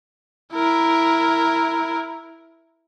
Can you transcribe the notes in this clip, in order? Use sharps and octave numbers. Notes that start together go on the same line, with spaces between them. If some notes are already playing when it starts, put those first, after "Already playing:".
E4 A#4